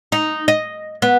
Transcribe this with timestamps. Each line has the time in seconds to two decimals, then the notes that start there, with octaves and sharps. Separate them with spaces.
0.12 D#4
0.48 D#5
1.02 B3